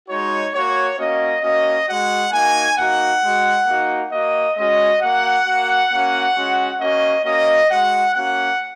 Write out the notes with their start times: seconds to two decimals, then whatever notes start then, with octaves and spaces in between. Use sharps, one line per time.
0.08 G#3 D#4 F#4 C#5
0.53 A#3 F#4 C#5
0.97 A#3 C#4 F#4 D#5
1.42 A#3 C#4 F#4 D#5
1.87 G#3 F#4 F#5
2.32 A#3 D#4 F#4 G#5
2.77 A#3 D#4 F#4 F#5
3.22 G#3 F#4
3.66 A#3 D#4 F#4
4.11 A#3 F#4 D#5
4.56 G#3 C#4 F#4 D#5
5.01 A#3 F#4 F#5
5.46 A#3 F#4
5.91 A#3 C#4 F#4
6.35 G#3 C#4 F#4
6.80 A#3 C#4 F#4 D#5
7.25 A#3 C#4 F#4 D#5
7.69 G#3 F#4 F#5
8.14 A#3 C#4 F#4 F#5